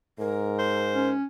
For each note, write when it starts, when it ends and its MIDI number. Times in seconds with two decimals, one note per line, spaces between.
0.19 1.18 44
0.19 1.10 70
0.58 1.12 72
0.95 1.25 61